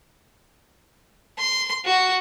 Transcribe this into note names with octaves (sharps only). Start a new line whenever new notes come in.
C6
F#4